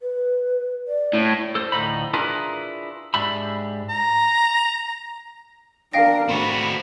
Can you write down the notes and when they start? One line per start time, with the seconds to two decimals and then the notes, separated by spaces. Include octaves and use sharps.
0.01 B4
0.88 D5
1.14 A2
1.55 A4 C5
1.72 D2 A2 C3 F3 D#4 B5
2.14 D4 E4 F4 G#4 A#4 B4
3.14 G#2 D4 G4 E5 B5
3.89 A#5
5.93 D4 A#4 F5 G5 A#6
6.29 A3 C4 F#4 B5